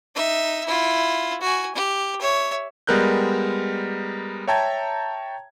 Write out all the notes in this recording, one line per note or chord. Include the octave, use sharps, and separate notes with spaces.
D#4 E5
E4 F4
F#4 G#5
G4
C#5 E5
G3 G#3 B3 A#4 F#6 G6
C#5 E5 G5 A5 A#5 G#6